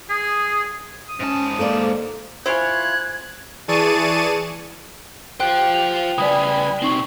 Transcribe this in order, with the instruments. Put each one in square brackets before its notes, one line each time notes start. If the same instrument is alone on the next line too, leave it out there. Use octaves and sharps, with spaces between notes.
[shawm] G#4
D#6
[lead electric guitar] G#2 A5 [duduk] C#4
[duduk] A#3 [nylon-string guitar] A4 C5 D5
[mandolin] E4 F4 C#5 [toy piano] C5 G#5 [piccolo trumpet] F#6 [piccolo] G#6
[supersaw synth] E3 G#4 D5 A5 C#6 D#7
[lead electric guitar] F4 C5 [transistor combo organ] G4 [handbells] G5 F#6
[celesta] F7
[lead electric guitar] C#3 G3 [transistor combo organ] B4 G#5 [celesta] D5 D#6
[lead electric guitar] B2 C4 [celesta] D#4 C#6 F#7